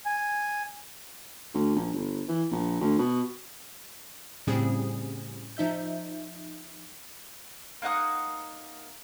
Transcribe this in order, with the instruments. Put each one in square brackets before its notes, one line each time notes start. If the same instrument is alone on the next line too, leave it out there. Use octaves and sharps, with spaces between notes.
[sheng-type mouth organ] G#5
[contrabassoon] D2
A#1
G1
E3
A#1
D2
B2
[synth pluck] A2 C#3 G3 C4 G#4
F3 D#4 E5 G6
[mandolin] A#3 D#4 F#5 D#6